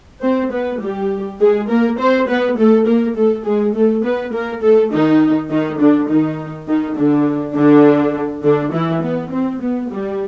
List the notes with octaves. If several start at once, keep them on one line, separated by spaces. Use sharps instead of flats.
C4 C5
B3 B4
G3 G4
G#3 G#4
A#3 A#4
C4 C5
B3 B4
A3 A4
A#3 A#4
A3 A4
G#3 G#4
A3 A4
B3 B4
A#3 A#4
A3 A4
D#3 D#4
D#3 D#4
D3 D4
D#3 D#4
D#3 D#4
D3 D4
D3 D4
D3 D4
E3 E4
B3
C4
B3
G3